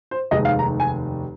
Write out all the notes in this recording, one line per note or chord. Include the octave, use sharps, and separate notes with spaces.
C5
F1 D#2 D#3 G#3 D#5
F5
A#5
G#5